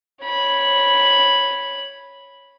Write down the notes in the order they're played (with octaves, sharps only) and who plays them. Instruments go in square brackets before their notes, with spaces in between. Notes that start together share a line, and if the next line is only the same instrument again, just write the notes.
[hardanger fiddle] C#5 B5